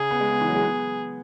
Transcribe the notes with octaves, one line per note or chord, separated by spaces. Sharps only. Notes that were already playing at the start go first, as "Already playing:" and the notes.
Already playing: C#3 G#4
B3
G#3
B3
E3
F#3
G#3
B3